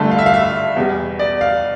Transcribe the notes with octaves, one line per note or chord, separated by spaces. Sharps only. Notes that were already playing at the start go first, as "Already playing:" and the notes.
Already playing: G1 G2 D3 A3 A5
F5
E5
F5
E5
E2 B2 G3
D5
F5